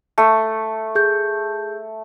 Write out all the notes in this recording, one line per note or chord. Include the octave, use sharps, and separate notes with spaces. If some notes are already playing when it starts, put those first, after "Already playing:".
A3
G#4 G6